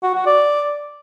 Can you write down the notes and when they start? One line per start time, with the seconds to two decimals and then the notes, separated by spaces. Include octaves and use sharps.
0.03 F#4
0.14 F#4
0.26 D5